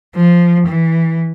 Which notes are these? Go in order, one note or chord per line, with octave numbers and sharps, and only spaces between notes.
F3
E3